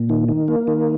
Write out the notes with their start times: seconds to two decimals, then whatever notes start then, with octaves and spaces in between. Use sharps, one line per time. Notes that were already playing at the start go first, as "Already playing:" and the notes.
Already playing: A#2
0.09 D#3
0.29 D#3
0.48 A#3
0.67 D#3